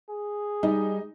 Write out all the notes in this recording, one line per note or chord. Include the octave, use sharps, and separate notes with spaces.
G#4
G3 D#4